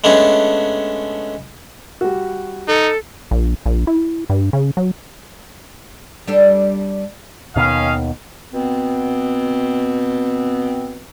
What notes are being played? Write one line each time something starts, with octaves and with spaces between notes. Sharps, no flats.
G#3 A3 B3 C#4 D4
G3 F#4
D#4 A4
A#1
A#1
E4
G2
C#3
F#3
G3 D4 A4
D#2 B2 D#3 C#4 D#5 F5
B2 B3 C4